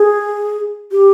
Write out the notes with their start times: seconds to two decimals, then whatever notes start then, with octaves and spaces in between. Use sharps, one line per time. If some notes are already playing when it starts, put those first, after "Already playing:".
Already playing: G#4
0.92 G4